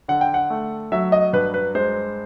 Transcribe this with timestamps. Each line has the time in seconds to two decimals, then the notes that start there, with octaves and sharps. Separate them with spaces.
0.08 D3 F#5
0.21 G5
0.34 F#5
0.50 A3
0.92 F#3 E5
1.12 D#5
1.33 G2 B4
1.54 B4
1.75 G#3 C5